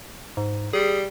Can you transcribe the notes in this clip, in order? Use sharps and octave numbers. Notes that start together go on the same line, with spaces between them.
G#2
G3 G#4